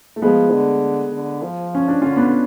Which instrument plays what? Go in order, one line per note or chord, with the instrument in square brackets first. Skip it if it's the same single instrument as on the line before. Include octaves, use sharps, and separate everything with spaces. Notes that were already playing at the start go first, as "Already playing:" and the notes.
[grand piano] A3
[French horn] F3 [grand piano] G#3 B3
[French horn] D3
D3
F3
[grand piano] C#4
D4
[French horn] D3 [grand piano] C#4 F4
[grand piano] B3 D4